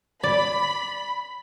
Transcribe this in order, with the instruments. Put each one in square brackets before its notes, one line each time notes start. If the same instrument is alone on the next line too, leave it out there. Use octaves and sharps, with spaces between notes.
[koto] D5 [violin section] B5